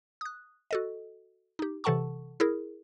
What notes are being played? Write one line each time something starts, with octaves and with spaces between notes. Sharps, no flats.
D#6 F#6
F#4 A4 D#5
D#4 G4
C3 E3 A4 F#5 A5 C#6
E4 G#4 A#4